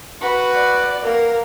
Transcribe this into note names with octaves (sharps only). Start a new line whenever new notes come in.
F#4 B4
D5
A#3 A#4